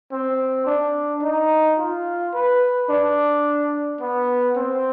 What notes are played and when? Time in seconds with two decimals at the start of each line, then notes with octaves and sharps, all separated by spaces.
0.12 C4
0.67 D4
1.23 D#4
1.79 F4
2.34 B4
2.90 D4
4.01 B3
4.57 C4